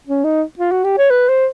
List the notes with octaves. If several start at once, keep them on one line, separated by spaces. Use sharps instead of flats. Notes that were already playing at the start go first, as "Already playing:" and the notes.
C#4
D#4
F4
F#4
G4
C#5
B4
C5